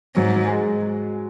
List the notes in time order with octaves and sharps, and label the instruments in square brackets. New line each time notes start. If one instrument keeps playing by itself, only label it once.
[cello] G#2 [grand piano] F#3
[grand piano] F#3
G#3